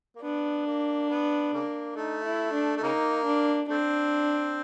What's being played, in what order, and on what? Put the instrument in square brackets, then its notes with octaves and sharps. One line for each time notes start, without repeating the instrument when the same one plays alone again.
[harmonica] A#3
[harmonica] B3 [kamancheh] D4
[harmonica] A#3
B3
C#3 A#3
[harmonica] A3 [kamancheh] D#4
[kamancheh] E4
D4
[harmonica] A3
[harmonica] C#3 A#3 [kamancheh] D#4
[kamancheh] D4
[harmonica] A3 C4 [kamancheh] D4